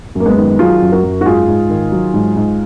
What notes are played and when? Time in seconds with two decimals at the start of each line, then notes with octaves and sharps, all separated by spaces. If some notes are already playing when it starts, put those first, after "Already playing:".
0.15 F#2 A#3
0.26 G#3 B3
0.37 D#3
0.59 F#3 F4 G#4
0.81 F#2
0.92 F#4 A#4
1.03 F#2
1.21 F#4
1.26 G#2 F4 G#4
1.48 G#2
1.69 D#3
1.92 F#3
2.14 G#2
2.36 G#2